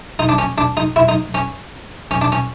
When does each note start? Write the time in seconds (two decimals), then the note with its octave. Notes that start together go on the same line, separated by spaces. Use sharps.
0.19 D#4
0.29 D4
0.38 C#4
0.58 D4
0.77 D#4
0.96 E4
1.08 D#4
1.34 C#4
2.11 C#4
2.21 D4
2.32 C#4